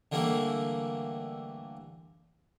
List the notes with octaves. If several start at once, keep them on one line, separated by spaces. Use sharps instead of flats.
D3 E3 G3 A3 A#3